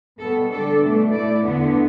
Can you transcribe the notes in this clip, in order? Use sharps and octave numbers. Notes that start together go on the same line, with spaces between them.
B2 G3 B3 A4
D3 G3 D4 A4
B2 A3 D4
A2 A3 E4 D5
E2 D3 B3